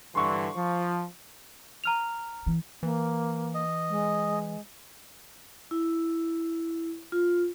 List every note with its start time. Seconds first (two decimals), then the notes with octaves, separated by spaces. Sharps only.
0.15 G2 D3 E3 C6 C#6
0.55 F3
1.84 A#5 F6 F7
2.46 E3
2.83 E3 A#3
3.54 D#5
3.89 G#3
5.71 E4
7.12 F4